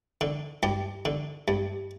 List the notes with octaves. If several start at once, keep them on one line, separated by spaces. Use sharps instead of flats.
D3
G2 G4
D3
G2